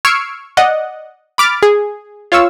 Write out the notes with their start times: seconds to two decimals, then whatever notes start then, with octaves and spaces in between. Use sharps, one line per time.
0.05 C#6 E6 F6 G#6 C7 D7
0.57 D5 D#5 F#5
1.38 B5 D6 F6 A6
1.63 G#4
2.32 F4 C#5 F5 C#6 E6